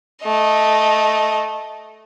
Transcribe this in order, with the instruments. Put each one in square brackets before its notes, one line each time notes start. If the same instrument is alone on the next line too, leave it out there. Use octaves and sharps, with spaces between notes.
[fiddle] A3 D#5